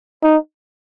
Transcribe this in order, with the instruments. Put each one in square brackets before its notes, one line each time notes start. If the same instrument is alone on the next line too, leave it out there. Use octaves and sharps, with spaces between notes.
[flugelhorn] D#4